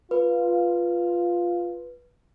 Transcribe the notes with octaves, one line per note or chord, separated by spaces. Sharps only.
F4 B4